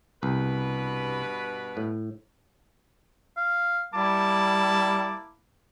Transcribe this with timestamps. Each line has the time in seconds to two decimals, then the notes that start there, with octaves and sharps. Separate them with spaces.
0.23 C2 G2 B2 B4
1.77 A2
3.37 F5
3.94 G3 A#3 E4 A5 D6